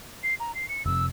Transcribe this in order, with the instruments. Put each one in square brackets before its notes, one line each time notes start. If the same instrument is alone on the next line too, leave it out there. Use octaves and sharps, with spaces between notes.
[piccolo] C7
A#5
C7
C#7
[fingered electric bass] F1 C3 [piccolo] E6